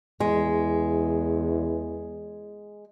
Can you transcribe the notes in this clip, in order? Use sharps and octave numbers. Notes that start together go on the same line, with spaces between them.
E2 G#3